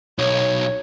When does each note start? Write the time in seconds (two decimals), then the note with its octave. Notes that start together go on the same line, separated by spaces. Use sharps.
0.19 B1 C#5